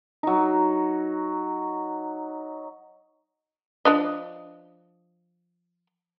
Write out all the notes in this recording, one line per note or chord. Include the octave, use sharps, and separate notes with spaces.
F#3 D#4
F3 D4 D#5